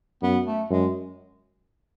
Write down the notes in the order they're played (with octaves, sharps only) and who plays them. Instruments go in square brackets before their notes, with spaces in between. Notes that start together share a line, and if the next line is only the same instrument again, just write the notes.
[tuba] F#2 [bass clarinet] B3
[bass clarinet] A3
[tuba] F#2 [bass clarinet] G#3